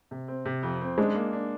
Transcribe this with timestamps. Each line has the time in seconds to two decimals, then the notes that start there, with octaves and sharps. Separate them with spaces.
0.11 C3
0.28 C4
0.45 C3
0.63 F2
0.81 C4
0.98 G#3 D4
1.15 A#3
1.33 D4